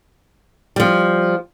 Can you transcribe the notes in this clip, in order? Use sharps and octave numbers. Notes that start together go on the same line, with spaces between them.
F3 G3